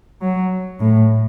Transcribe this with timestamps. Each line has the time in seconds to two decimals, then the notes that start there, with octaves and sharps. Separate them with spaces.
0.22 F#3
0.80 A2